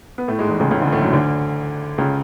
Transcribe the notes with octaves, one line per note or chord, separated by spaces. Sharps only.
B3
A2 A3
G#2 G#3
E2 E3
C#2 C#3
C#2 C#3
D2 D3
A2 A3
F#2 F#3
D2 D3
C#2 C#3